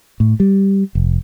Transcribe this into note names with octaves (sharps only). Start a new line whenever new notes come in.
A2
G3
F1